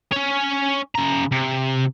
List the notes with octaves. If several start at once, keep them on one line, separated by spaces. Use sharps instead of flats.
C#4 C#5
C#3 A#5
C3